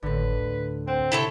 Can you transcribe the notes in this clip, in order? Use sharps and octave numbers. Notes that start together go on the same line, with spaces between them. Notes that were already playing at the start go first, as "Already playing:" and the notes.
G#1 A2 D3 B4
D2
C4 F#5
C3 E4 A4 C#5